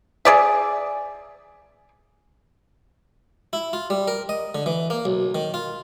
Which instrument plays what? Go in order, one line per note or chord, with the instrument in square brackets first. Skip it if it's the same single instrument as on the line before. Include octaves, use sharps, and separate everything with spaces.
[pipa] G#4 D5 E5
[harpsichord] E4
F4
G3
A#4
D#5
D3
E3
A#3
B1
D#3
F4